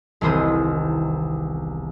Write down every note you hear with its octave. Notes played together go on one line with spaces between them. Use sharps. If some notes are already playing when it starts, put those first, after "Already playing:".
E1 C2 D#3 G#3 C4 D#6